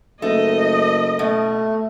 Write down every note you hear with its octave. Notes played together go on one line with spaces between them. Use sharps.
F#1 A3 D#5
B2 A3